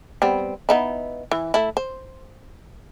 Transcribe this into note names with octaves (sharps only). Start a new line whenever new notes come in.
G3 B3 C4
B3 D#4 E4
E3
A3 E4
C5